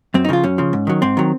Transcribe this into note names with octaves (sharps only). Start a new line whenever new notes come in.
F#2 C4
D#4
C#3 F3 F4
F#2 C#4
C#3 F3
G#2
D#3 F#3
G#2 C4
D#3 F#3